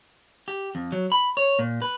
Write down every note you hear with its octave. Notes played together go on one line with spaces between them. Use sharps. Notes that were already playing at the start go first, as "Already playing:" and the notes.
G4
F2
F#3
B5
C#5
A#2
B4